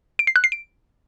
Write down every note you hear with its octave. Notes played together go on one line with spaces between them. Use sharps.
D7
C7
F#6
C7
D7